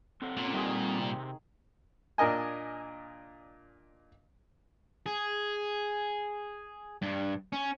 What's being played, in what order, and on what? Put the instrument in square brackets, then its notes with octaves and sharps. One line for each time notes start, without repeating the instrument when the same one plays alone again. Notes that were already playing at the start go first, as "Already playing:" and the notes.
[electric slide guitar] C4 A4 F#5
[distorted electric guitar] A#2 [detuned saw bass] C#4
[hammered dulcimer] D#3 G#4 [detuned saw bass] G3
[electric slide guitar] C3
[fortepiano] A#2 D4 A#4 D#5 G#5
[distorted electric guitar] G#4
G2
C#4